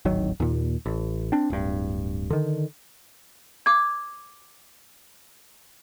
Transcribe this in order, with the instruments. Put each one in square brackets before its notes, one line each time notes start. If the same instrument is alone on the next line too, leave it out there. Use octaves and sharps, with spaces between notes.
[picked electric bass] D1 G#1 D#3 F#3
D#2 A#2
A1
C4 D4
D1 G2
D3 D#3
[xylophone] D6 G#6